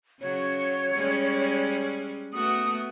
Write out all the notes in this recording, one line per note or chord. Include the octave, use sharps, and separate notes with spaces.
C#3 F#3 C#5
G3 G#3 C#4
A3 B3 F#4 D#6